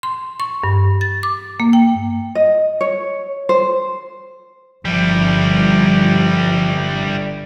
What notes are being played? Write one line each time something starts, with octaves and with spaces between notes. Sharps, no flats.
C6
C#6
G2
A6
D6
A#3
G5
D#5
C#5
C5
G1 F3 G3 E4